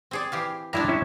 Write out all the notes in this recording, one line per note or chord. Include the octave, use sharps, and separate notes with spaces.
C4 G#4 D5
E3 G4 F5
G3 G#3 D4 E4 E5 A#5
C#4 E4 E5